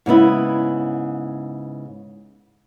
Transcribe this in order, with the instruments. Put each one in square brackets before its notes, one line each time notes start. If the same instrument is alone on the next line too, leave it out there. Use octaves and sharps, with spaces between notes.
[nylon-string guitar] G#2 C#3 B3 E4